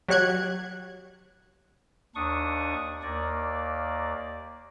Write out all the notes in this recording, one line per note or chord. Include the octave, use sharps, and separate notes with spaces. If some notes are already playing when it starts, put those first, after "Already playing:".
F#3 G4 C#5 F#6 G#6
D#2 D4 C#6 D#6
D#2 A#3 D5